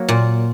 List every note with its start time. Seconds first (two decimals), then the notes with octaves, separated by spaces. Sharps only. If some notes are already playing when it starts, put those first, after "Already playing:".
Already playing: F#3 A#3
0.08 A#2